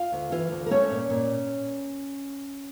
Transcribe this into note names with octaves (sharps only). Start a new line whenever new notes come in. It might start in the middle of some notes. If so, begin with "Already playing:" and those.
Already playing: F4 F5
D2
E3 F4 F5
D2
A#4
A3 C#4 C#5
A#2
A#2